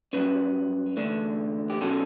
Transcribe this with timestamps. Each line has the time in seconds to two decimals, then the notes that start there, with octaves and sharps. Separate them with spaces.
0.13 G2 F#3 C#4 B4
0.97 E2 D3 A3 D4
1.70 G4
1.81 B2 F#3 C#4 A4